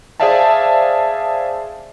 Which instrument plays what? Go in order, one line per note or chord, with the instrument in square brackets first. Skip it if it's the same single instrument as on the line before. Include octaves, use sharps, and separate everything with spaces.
[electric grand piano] G#4 C5 D5 E5 F5 A5